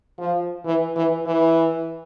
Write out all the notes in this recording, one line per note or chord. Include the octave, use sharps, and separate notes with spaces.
F3
E3
E3
E3